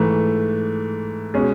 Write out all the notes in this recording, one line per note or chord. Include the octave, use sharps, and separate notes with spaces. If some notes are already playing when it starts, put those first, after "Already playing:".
Already playing: G#2 E3 A3
B2 G#3 C#4 G#4